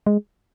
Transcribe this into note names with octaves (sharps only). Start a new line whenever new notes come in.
G#3